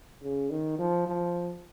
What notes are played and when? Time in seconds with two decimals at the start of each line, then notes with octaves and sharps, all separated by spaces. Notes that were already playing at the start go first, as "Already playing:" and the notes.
0.23 C#3
0.50 D#3
0.79 F3
1.07 F3